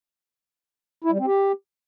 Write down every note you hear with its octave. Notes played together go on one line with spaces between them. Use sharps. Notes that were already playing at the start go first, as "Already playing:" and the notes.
E4
G3
C4
G4